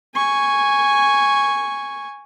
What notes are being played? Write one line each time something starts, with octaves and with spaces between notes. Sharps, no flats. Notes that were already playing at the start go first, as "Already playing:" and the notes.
G#5 C#6